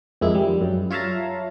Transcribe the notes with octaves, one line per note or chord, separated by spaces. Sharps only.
F2 D#3 G#3 A#3 E4
G3
F#2
F4 C#5 E5 F5 A5 A#5